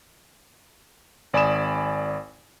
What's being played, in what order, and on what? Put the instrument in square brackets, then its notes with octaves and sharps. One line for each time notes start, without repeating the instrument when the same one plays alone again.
[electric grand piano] G#1 D5 G#5 B5 D#6 E7